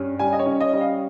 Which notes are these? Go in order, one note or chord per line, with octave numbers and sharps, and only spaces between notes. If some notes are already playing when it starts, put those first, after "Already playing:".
Already playing: G2 C#4
G3 G#5
D#5
C#5
C#4
D#5
G3
F5